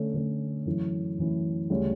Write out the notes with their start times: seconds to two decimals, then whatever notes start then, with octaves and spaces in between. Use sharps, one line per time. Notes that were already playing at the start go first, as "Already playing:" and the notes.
Already playing: D3 A3 C#4
0.14 D3 A3 C#4
0.66 F#2 E3 A3 C#4 E4
1.18 F#2 E3 A3 C#4 E4
1.70 D2 C#3 G3 C#4